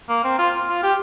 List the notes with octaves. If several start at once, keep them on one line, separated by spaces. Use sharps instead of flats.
A#3
C4
F4
F4
G4